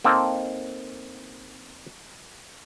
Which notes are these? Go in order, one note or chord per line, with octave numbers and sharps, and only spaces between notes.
A#3 C4 D#4 A4